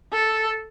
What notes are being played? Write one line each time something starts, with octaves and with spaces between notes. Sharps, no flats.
A4